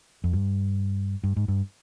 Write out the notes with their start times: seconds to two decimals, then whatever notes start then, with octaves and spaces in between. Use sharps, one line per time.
0.24 F2
0.33 G2
1.24 G2
1.37 G#2
1.48 G2